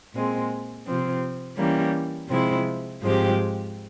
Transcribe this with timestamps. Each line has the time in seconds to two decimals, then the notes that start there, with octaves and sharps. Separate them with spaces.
0.14 A#2 G#3 C4
0.86 C3 F3 C4
1.58 E3 G3 A#3 C#4
2.30 C3 F3 G#3 C4 E4
3.02 G#2 F3 G#3 C4 G4